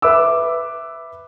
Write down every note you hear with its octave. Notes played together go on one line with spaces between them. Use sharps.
B4 E5 D6 E6